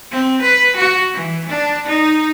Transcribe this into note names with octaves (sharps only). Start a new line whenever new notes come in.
C4
B4
F#4
E3
D4
D#4